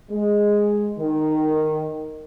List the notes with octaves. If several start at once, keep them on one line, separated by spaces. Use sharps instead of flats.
G#3
D#3